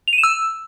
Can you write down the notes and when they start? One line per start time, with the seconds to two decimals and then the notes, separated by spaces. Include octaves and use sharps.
0.08 F7
0.13 D#7
0.18 E7
0.23 E6